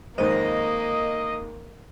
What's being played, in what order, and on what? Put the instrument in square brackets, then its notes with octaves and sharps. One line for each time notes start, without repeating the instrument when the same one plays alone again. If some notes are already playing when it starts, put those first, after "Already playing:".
[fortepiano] F2 G#2 D#3 [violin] A#3 [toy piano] C5 [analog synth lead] D#5